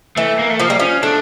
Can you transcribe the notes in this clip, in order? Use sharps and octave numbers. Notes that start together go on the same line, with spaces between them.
E3 A3
A#3
A3
F3 A#3
G3
F3 C#4
A3 D4